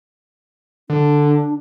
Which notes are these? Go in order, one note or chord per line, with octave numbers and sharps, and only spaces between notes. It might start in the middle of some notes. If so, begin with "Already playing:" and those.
D3 D4